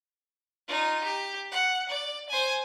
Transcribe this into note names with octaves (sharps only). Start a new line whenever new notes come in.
D#4 F4
G4
F#5
D5
C5 G#5